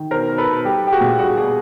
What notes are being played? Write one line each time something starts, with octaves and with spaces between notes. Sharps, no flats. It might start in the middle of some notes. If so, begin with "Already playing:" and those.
Already playing: D#3
B2 A#4 C5
B2
A4 B4
B2
G3 G4 A4
G3 G4
F#4 G#4
A#2
G3 F#4 G#4
B2 F#4 G#4